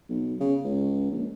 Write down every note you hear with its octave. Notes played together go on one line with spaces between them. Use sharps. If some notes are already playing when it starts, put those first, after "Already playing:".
B1
C#3
C#2
A#1